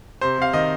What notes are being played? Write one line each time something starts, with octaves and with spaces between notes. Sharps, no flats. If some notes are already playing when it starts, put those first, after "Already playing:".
C3 C5
C3 F5
D#3 D#5